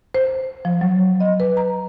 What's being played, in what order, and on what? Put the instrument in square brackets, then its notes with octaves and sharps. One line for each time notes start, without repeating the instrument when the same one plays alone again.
[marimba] C5
F3
F#3
D#5
B4
A#5